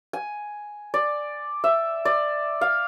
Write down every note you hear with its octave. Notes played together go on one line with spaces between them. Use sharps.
G#5
D5
E5
D5
F5